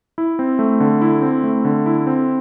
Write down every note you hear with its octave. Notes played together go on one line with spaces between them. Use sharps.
E4
C4
A3
D3
E4
C4
A3
D3
E4
C4